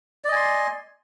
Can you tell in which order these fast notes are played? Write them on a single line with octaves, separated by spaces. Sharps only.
D5 D#5 G#5 C6